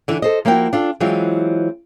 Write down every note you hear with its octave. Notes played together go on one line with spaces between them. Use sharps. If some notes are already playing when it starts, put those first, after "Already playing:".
D3 E3
A4 C5 D#5
F3 A#3 E4 F#4 G5
D4 F4 A4
E3 F#3 G#3 C4 F4